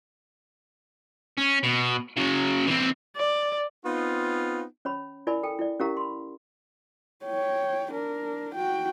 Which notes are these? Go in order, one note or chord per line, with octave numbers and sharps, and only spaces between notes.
C#4
B2
C#3 F#3
E3 C4
D5
B3 C4 D#4 F4
C#4 C#5 B5
E4 A#4 D5 G#5 B5
A4 G5 A5
E4 D5
C#4 E4 G4 A#4 F5 A#5
B5 C6
C#5 G5
D4 A#4
F#4 G5